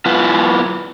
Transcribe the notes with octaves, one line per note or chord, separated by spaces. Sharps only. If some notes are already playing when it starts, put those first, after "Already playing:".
B3 E4 F4 B4